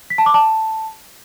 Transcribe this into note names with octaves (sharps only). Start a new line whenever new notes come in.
B6
A5
D6
A5